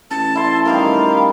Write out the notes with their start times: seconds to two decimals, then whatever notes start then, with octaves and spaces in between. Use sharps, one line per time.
0.11 A1 A5
0.35 E4 C6
0.65 D#3 G3 A#4 F5